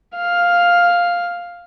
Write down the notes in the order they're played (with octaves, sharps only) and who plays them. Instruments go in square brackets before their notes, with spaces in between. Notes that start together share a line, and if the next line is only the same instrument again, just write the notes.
[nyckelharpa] F5